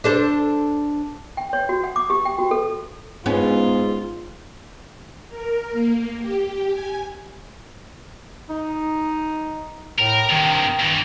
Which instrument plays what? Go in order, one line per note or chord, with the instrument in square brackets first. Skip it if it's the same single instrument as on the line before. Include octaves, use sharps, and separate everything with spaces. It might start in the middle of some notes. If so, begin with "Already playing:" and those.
[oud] D4 A4 C5
[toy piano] G5
C#5
F#4
F#5
D6
G4
G5
F#4
A4
[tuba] G#2 [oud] B3 C#4 [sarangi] F4
[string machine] A#4
A#3
G4
G#5
[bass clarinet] D#4
[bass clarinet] A2 [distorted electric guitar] A#4
[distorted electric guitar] G2 C3 [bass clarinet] D#3
[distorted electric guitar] G2 E3